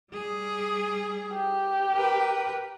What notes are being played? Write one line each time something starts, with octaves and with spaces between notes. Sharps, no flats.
G3 G#4
G4
A#4 B4